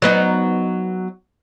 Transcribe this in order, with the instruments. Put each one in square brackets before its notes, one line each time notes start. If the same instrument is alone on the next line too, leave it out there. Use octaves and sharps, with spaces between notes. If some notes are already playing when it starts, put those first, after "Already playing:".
[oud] F#3 B3 D#4